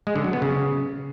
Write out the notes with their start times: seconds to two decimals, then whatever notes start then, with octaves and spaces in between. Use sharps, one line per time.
0.07 G#3
0.16 D3
0.24 F#3
0.33 B3
0.42 C#3